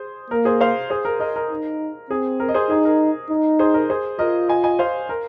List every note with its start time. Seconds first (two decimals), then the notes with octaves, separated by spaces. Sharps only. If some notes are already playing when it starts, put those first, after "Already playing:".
Already playing: G#4 C5
0.30 A#3 A#4
0.45 G#4 C5
0.61 C5 F5
0.90 G#4 C5
1.05 A#4
1.20 A#4 D#5
1.36 A#4
1.50 D#4
2.10 C4 G#4
2.40 A#4
2.49 D#5
2.54 G#4 C5
2.70 D#4 G#4
2.85 A#4
3.30 D#4
3.59 G#4 C5
3.74 A#4 D#5
3.90 G#4 C5
4.19 F4 A#4 D#5
4.49 D#5 G#5
4.64 D#5 G#5
4.79 C5 F5
5.09 A#4